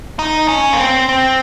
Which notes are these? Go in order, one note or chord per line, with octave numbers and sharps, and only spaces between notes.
D#4
C#4
A#3
C4
C4